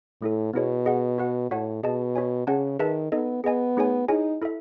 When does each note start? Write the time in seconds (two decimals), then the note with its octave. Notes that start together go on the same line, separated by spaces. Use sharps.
0.22 A2 A3 E4 A4
0.54 B2 B3 E4 G#4 C#5
0.86 G#4 D#5 F#5
1.18 F#4 B4 F#5
1.50 A2 F#4 C#5 F#5 A5
1.83 B2 G#4 D#5 A5
2.16 F#4 C#5 G#5
2.47 C#3 C#4 G#4 C#5 F#5 A5
2.79 D#3 G#4 B4 E5 A5
3.12 B3 D#4 A4 D#5
3.44 B3 G#4 D#5 G#5
3.77 A3 D#4 G#4 C#5 G#5
4.08 D#4 E4 G#4 C#5 G#5
4.42 E4 A4 E5